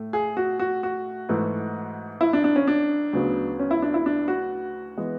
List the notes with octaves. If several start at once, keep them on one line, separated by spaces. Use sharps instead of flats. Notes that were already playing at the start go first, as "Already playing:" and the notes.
Already playing: A2 A3
G#4
F#4
F#4
F#4
G#2 E3 A3
E4
D4
D4
C#4
D4
D2 C#3 F#3 B3
C#4
E4
D4
E4
D4
F#4
E3 G#3 B3